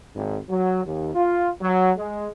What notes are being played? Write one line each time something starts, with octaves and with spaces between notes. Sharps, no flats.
G#1
F#3
D#2
F4
F#3
G#3